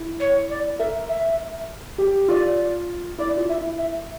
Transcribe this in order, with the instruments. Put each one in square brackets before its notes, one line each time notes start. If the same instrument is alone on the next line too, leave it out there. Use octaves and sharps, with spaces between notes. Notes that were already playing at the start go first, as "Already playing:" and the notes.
Already playing: [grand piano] E4
[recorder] C#5
D5
[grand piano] A#4 [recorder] E5
[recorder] E5
[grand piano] G4
[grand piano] F4 [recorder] D5
[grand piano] E4 [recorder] D5
[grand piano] F4
[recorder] E5
[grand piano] E4
[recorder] E5